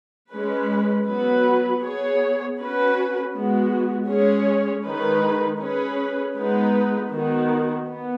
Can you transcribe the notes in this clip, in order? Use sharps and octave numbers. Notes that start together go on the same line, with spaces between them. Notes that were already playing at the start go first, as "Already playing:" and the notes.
G#3 C#4 B4
F#3 B3 F#4 B4
B3 G#4 C#5
C#4 F#4 B4
G#3 B3 F#4
G#3 C#4 G#4 C#5
D#3 G#3 D#4 B4
C#4 G#4 B4
G#3 B3 D#4 B4
D#3 B3 F#4
B3